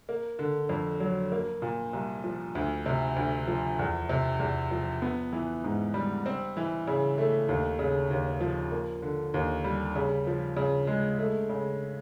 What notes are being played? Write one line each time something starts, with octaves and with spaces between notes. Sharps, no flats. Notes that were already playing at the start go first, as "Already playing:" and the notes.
A#3
D3
F2
F#3
A#3
A#2
C2
F3
D2
C3
D2
F3
E2
C3
E2
F3
B3
E3
G#2
G3
C4
E3
C#3
A3
D#2
C#3
D#2
F3
A#3
D3
D#2
G3
C#3
F3
C#3
G#3
A3
C#3